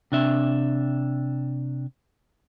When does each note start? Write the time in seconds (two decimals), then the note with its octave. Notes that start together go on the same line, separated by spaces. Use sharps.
0.12 C3 D4 E5